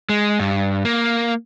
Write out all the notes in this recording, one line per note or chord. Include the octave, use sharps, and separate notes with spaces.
G#3
G2
A#3